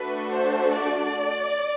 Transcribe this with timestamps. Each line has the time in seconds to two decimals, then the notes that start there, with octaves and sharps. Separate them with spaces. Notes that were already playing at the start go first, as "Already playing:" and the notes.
Already playing: A3 D4 F#4 A4 B4
0.31 C5
0.75 D5